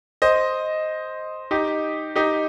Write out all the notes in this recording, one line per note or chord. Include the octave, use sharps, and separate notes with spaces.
C5 D#5
D#4 G4
D#4 G4